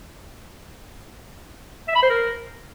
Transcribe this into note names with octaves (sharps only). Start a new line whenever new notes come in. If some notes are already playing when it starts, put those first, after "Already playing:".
E5
B5
C5
A#4